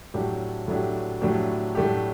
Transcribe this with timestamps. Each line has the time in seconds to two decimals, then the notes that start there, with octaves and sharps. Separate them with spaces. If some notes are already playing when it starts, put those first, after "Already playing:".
0.14 A2 F#3 A3 D4 G4
0.68 A2 F#3 A3 D4 G4
1.21 A2 F#3 A3 D4 G4
1.75 A2 F#3 A3 D4 G4